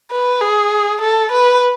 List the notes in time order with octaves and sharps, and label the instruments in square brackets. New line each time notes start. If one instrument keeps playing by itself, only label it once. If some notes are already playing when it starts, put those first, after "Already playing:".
[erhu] B4
G#4
A4
B4